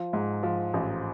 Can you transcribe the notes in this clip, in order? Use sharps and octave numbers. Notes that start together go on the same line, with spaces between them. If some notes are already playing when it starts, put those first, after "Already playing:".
Already playing: F3
G#2
F3
A1